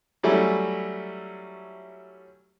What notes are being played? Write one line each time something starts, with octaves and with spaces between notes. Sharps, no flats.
F#3 G3 A3 C#4 E4